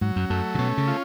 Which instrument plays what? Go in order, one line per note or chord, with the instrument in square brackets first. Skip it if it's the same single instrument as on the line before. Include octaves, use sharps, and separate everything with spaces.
[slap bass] G#2 [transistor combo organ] F#3
[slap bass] F#2
[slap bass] F#2 [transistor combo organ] A3
[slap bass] C#3
[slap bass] B2 [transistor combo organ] C#4
[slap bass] C#3
[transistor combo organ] F4